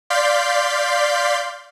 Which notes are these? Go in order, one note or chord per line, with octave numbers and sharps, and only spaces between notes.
D5 F5 C6 G6 B6